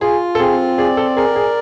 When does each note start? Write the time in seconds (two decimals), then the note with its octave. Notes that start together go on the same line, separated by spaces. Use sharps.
0.01 F4 G#4
0.35 A4
0.39 C4 G#4
0.77 G#4 D5
0.97 A4
1.17 G#4 A#4
1.36 G#4